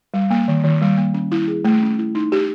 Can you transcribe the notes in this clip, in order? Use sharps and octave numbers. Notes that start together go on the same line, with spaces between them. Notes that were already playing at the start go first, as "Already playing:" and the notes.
G3
A#3
D#3
D#3
G3
A#3
C#4
E4
G#4
A3
C#4
E4
D#4
G4